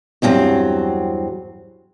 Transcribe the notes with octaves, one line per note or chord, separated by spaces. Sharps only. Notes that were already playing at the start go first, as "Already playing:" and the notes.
E2 G2 F#3 C4